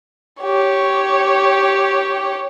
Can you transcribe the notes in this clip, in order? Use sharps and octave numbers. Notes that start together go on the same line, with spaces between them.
G4 C#5